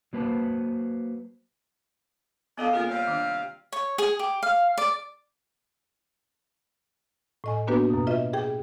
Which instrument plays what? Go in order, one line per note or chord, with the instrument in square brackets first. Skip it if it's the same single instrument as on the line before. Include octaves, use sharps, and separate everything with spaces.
[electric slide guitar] F#3 A#3 B4 C5 A5
[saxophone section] F2 D4 D#5 [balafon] B3 A4 F5
[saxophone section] C#3 A#4 [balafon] A#3 F4 G#4
[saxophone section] C3 G3 F5 [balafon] C#5
[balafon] D#3 D4
[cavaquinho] C#5
G#4
G4
F5
D5
[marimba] A2 D#5 G#5
A#3 B3 D4 F#4 G4 B4
F#2 B2
F4 B4 D#5 E5
G4 G#4 G5